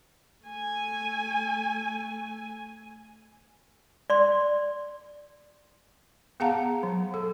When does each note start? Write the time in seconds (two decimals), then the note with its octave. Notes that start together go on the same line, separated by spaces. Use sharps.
0.45 A3 G#5
4.10 D5 C6
6.40 B3 G#4 F5 F#5 A5 A#5
6.83 F#3
7.14 A4